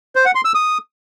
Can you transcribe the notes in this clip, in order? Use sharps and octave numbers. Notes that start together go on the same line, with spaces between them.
C5
F#5
C6
E6
D#6